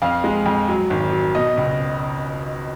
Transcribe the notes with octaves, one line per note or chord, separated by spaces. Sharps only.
F2 F5
G#3
F2
F#3
G#1
F#3
B2 D#5
C#2